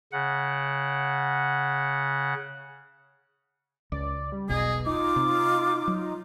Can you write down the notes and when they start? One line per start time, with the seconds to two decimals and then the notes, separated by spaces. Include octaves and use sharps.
0.12 C#3 F#5
3.92 C#2 D5
4.32 G3
4.49 E1 B1 B2 G#4 D#5
4.86 D#4 F4 D6
5.16 C3
5.88 F#3